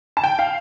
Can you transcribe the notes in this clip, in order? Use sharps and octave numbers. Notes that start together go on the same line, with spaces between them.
A5
G5
F5